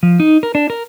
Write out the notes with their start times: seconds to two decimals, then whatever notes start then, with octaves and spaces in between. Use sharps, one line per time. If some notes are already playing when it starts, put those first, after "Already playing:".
0.03 F3
0.20 D#4
0.43 A#4
0.55 D4
0.70 A#4